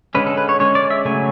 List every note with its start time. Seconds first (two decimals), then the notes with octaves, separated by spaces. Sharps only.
0.15 D3 G#3 C#4 B4
0.27 A4
0.37 B4
0.49 C#5
0.60 D3 G#3 C#4 C#5
0.75 D5
0.90 E5
1.05 C#3 F#3 A3 G#5